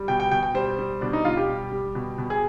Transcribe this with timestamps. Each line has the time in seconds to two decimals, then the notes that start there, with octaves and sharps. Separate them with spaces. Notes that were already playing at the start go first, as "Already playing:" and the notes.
Already playing: G3
0.08 B2 G5
0.20 G5
0.31 B2 G5
0.43 G5
0.54 G3 C5
0.78 G3
1.01 B2 D4
1.13 D#4
1.25 B2 F4
1.37 G4
1.48 G3
1.72 G3
1.95 B2
2.18 B2
2.30 G#4